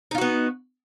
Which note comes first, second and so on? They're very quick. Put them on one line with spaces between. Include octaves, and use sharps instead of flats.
D#4 F4 F#4 B3